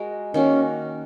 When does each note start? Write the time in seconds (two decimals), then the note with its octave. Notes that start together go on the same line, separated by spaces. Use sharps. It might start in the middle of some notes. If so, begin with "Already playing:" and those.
Already playing: G#3 F#4 A#4
0.34 D#3 A#3 C#4 F#4